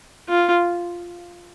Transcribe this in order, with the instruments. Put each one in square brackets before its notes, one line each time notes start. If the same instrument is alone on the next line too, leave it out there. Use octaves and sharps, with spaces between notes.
[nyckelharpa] F4